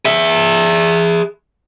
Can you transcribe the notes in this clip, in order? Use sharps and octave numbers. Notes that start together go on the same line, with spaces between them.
G#4 E5